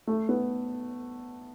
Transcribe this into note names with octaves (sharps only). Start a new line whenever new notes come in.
A3
B3